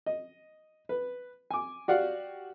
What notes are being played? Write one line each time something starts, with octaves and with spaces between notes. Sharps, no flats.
D#5
B4
G#5 D6
F#4 G4 D5 F5 F#5